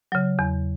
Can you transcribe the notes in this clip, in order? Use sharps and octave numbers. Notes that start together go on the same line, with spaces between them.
C#3 F#3
E2